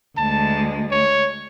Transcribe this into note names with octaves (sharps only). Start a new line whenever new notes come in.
D2 G#3 A5
C#5